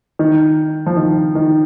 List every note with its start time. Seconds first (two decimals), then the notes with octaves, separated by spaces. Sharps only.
0.19 D#3
0.86 F3
0.97 D#3
1.35 D#3